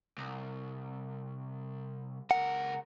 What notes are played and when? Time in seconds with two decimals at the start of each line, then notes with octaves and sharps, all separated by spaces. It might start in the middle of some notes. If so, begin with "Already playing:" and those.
0.18 C2
2.31 C#2 A#4 F#5